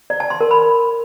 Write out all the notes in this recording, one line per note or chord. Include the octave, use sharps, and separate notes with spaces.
D5
A5
C6
A#4
B5